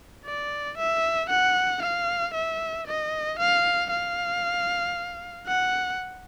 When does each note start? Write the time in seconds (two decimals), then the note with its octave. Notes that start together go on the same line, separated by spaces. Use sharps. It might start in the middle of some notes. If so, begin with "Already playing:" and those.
0.26 D5
0.77 E5
1.30 F#5
1.82 F5
2.34 E5
2.87 D#5
3.39 F5
3.91 F5
5.47 F#5